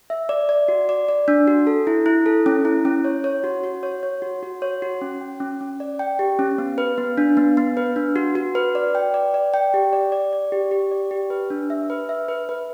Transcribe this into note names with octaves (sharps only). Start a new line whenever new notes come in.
E5
D5
D5
F#4
D5
D5
D4
F#4
A4
E4
E4
A4
C#4
E4
C#4
C#5
C#5
F#4
F#4
C#5
C#5
F#4
F#4
C#5
F#4
C#4
G5
C#4
C#4
D5
G5
G4
C#4
B3
B4
B3
D4
B3
B3
B4
D4
F#4
F#4
B4
D5
G5
D5
D5
G5
G4
D5
D5
D5
G4
G4
D5
G4
B4
D4
E5
B4
E5
B4
B4